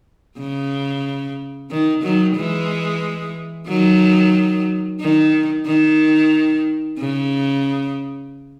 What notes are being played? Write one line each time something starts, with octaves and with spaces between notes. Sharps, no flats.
C#3
D#3
D#3 F#3
E3 G#3
D#3 F#3
D#3
D#3
C#3